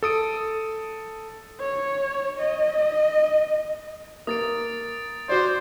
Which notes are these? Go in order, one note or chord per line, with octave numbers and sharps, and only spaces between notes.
A4 D#6 D7
C#5
D#5
A#3 D#6 A6 D7
F#4 C5 D5